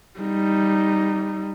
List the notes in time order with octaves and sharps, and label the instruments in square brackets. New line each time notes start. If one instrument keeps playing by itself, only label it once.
[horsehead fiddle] G3 D#4